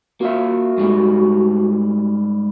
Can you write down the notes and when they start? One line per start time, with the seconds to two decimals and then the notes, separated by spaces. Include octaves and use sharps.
0.21 A#3 F4 F#4 E5
0.78 G#2 G3 A3